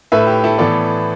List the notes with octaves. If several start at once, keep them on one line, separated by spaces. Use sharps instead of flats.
A2 A3 B4 E5
G4
E4 A4
A2 E3 B3 A4 D5